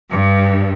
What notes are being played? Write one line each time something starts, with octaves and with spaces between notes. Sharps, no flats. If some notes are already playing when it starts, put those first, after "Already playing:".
G2